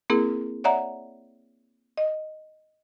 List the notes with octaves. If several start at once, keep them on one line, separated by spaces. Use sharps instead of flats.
A#3 C4 E4 G#4 A#4
C#5 D5 E5 F#5 A#5
D#5